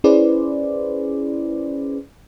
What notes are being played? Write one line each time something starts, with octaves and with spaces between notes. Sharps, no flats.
C#4 E4 G#4 B4 C5 D5